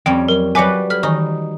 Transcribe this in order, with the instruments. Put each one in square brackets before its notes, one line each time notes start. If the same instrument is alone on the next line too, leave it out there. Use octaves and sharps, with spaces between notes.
[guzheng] F2 G3 C#4 [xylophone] G5
[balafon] F#3 [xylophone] A#4
[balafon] F#3 C#5 [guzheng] G3 F#4 B4 [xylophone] G#5 D6 C#7
[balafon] A4 B4 [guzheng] B5 [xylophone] F6
[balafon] D#3 E3 G#5 [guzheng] D#4